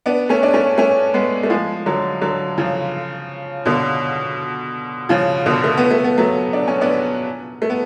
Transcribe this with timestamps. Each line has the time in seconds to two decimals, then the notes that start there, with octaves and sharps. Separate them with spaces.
0.06 B3 D4
0.29 A3 C#4
0.43 D4
0.54 A3 C#4
0.78 A3 C#4
1.14 G#3 B3
1.43 A3
1.50 F3 G#3
1.86 D3 F#3
2.21 D3 F#3
2.58 C#3 F3
3.65 B2 D3
5.09 C#3 F3
5.46 B2 D3
5.64 A3
5.77 B3
5.91 A3
6.04 B3
6.18 F#3 A3
6.53 D4
6.67 C#4
6.81 B3 D4
7.62 A3
7.70 B3